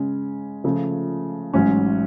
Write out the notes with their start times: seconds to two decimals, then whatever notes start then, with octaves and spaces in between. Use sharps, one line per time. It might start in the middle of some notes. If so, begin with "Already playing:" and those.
Already playing: C#3 G#3 C#4
0.64 C#3 F3 A3
1.54 A1 G#2 F#3 C#4